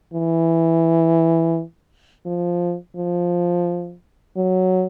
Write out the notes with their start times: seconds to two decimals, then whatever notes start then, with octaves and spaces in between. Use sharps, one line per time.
0.14 E3
2.26 F3
2.96 F3
4.37 F#3